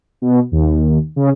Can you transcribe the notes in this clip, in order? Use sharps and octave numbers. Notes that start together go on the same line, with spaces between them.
B2
D#2
C#3